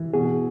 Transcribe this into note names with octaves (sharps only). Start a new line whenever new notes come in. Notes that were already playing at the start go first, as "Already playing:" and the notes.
Already playing: E3
B2 G#4